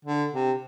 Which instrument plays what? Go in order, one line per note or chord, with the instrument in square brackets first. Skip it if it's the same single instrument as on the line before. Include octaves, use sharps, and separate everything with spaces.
[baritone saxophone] D3
C3